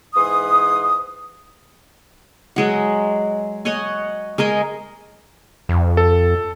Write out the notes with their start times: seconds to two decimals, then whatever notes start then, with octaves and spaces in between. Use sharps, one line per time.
0.15 G#2 E3 B4 C6 D#6
2.56 F#3 G#3 F#5
3.65 C#5 D#5 F#5 G#5
4.38 G#3 A#4 D#5 G#5
5.69 F2
5.97 A4